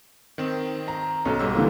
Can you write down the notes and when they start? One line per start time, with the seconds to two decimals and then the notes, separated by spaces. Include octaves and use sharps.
0.38 D#3 C4
0.88 A#5
1.25 B1 C#4 A4
1.39 G#2 G3 E6
1.55 D3 E3 A#3